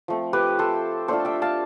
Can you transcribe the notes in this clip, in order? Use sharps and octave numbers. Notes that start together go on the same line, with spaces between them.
F3 A3 C4
G4 B4
A4 C5
A3 D4 F4 A4 C5
E5 G5
F5 A5